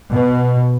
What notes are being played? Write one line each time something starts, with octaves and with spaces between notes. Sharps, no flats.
B2